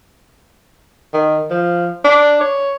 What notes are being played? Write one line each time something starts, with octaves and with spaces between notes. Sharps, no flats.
D#3
F3
D4
C#5